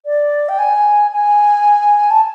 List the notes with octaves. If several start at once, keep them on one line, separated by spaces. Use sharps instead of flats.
D5
G5
G#5
G#5
A5